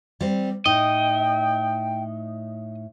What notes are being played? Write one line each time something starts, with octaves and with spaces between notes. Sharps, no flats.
G3 C4
A2 D#4 D#5 G5